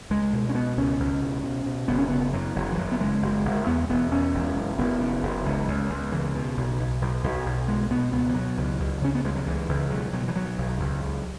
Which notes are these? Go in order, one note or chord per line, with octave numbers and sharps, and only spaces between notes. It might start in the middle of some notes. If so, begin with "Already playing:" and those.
C#2 G#3
B2
C#4
B2 B3
C#2 C#4
C#2
B2
B2
B2
F#1 B3
C#4
C#3 B3
F#2 F#3
F#1 F#3
E3
F#1 F#3
B3
C#3 G#3
F#1
F#1
E2 B3
E1 B3
E2 C#4
E1
F#2
F#1 B3
C#3
F#1
C#2
C#2
C#2
C#3 E3
B2
B1
B1
B1
B1
B1
B2 G#3
B2 B3
C#2 B3
E3
B2 F#3
C#2
C#2
C#3 C#4
B3
C#2 G#3
F#3
C#2 E3
C#2
B2 F#3
B2 F#3
E3
B2 F#3
B1
C#2
C#2